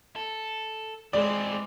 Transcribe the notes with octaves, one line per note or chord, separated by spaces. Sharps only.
A4
E3 G#3 C4 D5